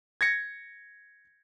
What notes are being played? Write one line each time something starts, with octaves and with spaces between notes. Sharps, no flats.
G#6 A#6 C#7